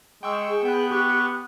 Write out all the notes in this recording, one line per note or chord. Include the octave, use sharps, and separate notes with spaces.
G#3 G5 C#6 E6
G#4
B3 G5 F#6
G4 C#6 F#6